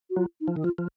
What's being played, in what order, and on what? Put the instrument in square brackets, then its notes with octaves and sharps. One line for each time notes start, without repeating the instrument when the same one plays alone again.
[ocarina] F#4
[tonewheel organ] F#3 [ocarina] F4
[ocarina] D#4
[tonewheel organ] F3
D#3
[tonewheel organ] F3 [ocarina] F4
[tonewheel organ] F3